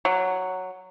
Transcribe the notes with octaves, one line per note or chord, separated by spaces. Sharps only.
F#3